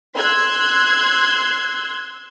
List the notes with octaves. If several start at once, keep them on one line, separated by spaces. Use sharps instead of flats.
C6 E6 F#6 G#6